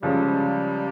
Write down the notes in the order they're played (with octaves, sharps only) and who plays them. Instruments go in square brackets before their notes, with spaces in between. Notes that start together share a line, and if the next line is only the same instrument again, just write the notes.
[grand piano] C#2 C#3 F3 G#3 C#4 [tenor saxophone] G3